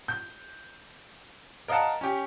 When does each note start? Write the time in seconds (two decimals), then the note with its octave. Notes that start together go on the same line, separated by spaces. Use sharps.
0.08 G6
1.68 A#4 D#5 F5 F#5 A5
2.01 C#4 G4